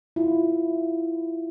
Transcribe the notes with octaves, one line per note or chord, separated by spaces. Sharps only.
E4 F4